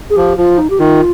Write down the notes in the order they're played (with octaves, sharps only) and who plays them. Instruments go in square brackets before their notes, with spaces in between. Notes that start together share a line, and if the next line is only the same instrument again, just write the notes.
[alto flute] G#4
[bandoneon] F3 [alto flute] G4
[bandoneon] F3 [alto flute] F4
[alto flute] D#4
G4
[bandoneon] D#3 [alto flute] F4